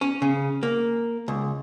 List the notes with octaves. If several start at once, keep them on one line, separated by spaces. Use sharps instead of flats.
C#4
C#3
A#3
C#2